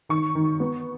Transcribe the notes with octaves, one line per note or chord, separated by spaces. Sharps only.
D#3 C#6
D#3
B3